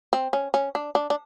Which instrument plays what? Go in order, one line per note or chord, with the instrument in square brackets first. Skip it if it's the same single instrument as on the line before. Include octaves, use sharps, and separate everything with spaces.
[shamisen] C4
C#4
C#4
D4
D4
D4